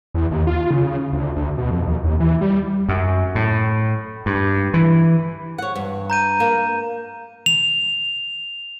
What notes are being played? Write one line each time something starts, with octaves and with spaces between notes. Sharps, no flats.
E2
D#2
F4
C#3
D2
D2
B2
F2
D#2
D#2
E3
G3
F#2
A2
G2
E3
C#5 F#5
G2
A#5 G6 D#7
A#3 A#5
F7